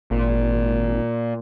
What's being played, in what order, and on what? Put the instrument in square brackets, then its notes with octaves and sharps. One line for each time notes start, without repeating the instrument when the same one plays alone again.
[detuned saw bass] G#1 [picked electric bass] A#2